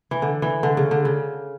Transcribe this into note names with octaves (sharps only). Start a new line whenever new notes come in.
E3
D3
E3
D3
C#3
D3
C#3